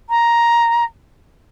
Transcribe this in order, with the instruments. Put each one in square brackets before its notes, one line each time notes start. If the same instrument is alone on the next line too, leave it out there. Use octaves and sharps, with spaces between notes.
[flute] A#5